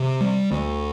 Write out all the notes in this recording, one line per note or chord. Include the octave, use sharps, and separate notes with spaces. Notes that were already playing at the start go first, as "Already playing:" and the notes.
Already playing: C3
G3
D2